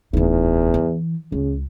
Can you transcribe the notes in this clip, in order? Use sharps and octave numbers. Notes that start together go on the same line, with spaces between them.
D1 E2 D#4
E3
C#2 C#3